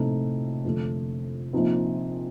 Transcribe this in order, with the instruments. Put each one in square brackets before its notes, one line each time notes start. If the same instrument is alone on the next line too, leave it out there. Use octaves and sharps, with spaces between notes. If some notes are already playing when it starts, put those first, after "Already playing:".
Already playing: [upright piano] A#1 A2 A3 C4 D#4 [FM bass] C3
[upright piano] F2 D3 A3
A#1 A#2 F3 C4 D#4